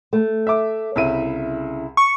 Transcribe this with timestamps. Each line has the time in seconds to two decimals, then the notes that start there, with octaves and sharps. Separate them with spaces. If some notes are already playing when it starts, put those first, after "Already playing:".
0.13 A3
0.47 E5 D6
0.96 C2 C#3 E4 E5 D#7
1.97 C#6